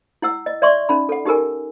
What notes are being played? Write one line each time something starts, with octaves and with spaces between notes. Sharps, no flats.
E4 F#5 E6
D#5
D5 E5 C6 C#6
C#4 D#4 B5
A4 F#5
D#4 G4 A4 A#4 G#5